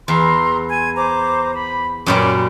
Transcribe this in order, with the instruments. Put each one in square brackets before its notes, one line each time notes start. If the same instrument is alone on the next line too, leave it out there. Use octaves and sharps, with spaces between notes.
[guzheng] E2 [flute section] A#5 C6 E6
[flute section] G#5 G#6
C5 A#5 D6
B5
[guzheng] F#2 A#2 G3 [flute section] C#5 D6